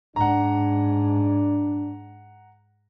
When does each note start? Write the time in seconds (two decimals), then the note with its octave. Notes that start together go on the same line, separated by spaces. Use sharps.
0.16 G#2 D4 F#5 A#5